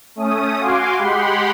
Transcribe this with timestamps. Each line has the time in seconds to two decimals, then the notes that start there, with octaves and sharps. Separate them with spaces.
0.15 A3 C#4 D#6
0.60 F#4 F5 G#5 C6 D6
0.97 G#3 G4 F#5 B5 C6